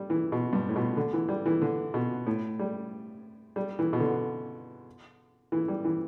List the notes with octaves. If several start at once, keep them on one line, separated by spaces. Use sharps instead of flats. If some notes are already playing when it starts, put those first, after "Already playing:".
Already playing: G3
E3
B2
G2
A2
B2
D3
E3
G3
E3
D3
B2
A2
G3
G3
E3
B2
D3
E3
G3
E3